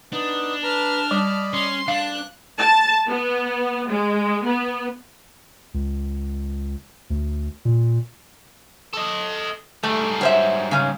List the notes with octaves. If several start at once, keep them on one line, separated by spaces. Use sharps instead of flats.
B3 D4 D#4
B4 A5 A#5 F6
G3 D5 D#5 B5
C#4 C6
D4 F5 A5 F#6
A5
B3
G#3
B3
C#2
D2
A#2
A4 D#5
G#2 G3 A3
F#3 C5 E5
C#3 C#4